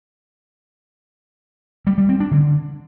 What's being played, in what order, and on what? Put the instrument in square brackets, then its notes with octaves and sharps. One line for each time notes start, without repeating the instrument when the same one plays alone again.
[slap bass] G3
G3
C4
D4
D3